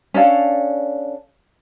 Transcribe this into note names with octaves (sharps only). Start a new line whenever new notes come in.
C#4 D4 A4 F5